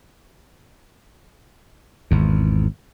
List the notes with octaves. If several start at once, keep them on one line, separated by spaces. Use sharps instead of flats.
G#1 E2